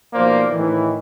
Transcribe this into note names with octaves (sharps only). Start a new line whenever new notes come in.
B1 F3 A#3 C5 D5
A2 D#3 E3